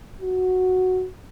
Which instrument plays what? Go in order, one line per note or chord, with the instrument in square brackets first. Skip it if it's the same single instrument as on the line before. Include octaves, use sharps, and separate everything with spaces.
[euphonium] F#4